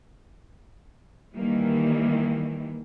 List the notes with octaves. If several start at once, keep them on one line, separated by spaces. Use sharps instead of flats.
D#3 E3 G3 A#3